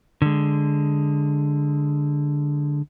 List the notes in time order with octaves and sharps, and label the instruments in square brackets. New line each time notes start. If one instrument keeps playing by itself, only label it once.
[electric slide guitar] D3 G#3